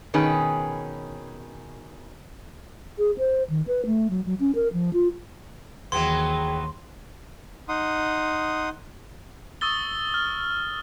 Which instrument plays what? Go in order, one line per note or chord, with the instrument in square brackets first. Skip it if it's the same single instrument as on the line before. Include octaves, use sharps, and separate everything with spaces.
[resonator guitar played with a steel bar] B2 D#3 C#4 G#4 B4
[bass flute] G#4
C5
D#3
B4
A3
F#3
F#3
C#4
A#4
F3
F4
[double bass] D#2 [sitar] E3 F#3 B3 [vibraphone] G#4 G5 [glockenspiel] C6
[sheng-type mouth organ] D#4 F#5 C6 D#6
[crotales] C#6 D#6 E6 A6 G7
F6